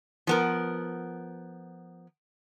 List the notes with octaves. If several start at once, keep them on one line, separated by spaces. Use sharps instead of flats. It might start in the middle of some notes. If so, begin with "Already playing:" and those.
F3 B3 A#4